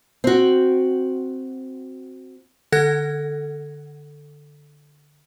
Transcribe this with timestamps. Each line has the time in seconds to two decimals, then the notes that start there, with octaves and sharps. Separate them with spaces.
0.24 C4 F#4
2.72 D3 A4 F#5 F#6 G#6 A#6